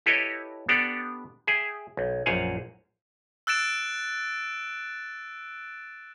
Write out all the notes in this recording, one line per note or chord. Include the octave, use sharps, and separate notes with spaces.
E4 G4 A4 B4 C#5 D#5
B3 D4 G4 A4 D5 F#5
G#4 E5 G5
B1
A#1 F#2 C5 F5 F#5 G#5
E6 F#6 A6 D7 E7